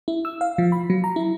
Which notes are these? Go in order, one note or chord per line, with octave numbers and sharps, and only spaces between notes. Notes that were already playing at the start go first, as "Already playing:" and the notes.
E4
E6
F5
F3
B5
F#3
A#5
E4